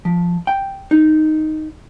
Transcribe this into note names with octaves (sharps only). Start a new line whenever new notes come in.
F3
G5
D#4